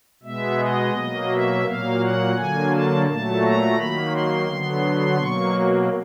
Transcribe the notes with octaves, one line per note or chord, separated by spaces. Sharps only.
B2 G#3 B3 E5
D#5
B2 F#3 A#3
E5
A#2 F#3 A#3 F5
F#5
D3 F#3 A#3 G#5
A5
A#2 F#3 A3 A5
A#5
D#3 F#3 A#3 B5
C6
D3 F#3 B3
B2 F#3 A#3 C#6